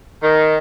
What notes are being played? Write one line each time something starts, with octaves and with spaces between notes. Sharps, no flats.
D#3